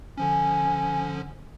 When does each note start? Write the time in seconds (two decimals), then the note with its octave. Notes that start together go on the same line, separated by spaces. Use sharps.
0.18 D3 F3 C#4 G#5